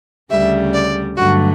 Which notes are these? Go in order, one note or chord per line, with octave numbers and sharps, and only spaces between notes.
D2 C#3 G3 E5
D5
G2 D3 F#3 A3 F#4